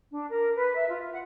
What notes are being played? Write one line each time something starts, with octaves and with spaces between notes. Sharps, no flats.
D4
A#4
B4
E5
F4
F#5